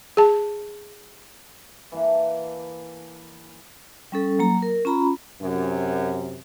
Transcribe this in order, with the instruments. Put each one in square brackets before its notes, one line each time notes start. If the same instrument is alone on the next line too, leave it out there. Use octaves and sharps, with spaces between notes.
[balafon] G#4 A5
[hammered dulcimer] E3 A#3 D4
[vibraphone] G3 C#4 A4
F#3 A#3 A#5
A#4
C#4 F4 A#5 B5
[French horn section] F#2 C3